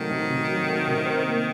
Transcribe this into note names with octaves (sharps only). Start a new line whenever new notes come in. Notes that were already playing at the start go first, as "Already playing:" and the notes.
Already playing: C3 D#3 F#3 A3
C3
C3
F#3
A3
C3
C5
A#3